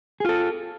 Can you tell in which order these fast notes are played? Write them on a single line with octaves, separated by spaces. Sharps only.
G#4 F4 A4